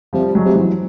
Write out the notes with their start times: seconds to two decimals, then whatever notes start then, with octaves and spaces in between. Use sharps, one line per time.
0.13 C3 F3 G3
0.35 F#3 G#3
0.45 C3
0.55 E3 F#3